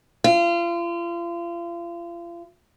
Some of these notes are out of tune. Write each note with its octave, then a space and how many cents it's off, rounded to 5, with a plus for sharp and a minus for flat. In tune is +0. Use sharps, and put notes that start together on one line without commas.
F4 -35